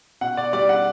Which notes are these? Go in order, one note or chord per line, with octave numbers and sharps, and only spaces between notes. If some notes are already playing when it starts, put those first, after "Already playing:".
B2 F#5
D5
G3 D5
F#5